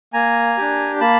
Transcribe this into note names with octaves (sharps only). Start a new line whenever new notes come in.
A#3 G#5 A#5
D4 G4
A#3 A5 B5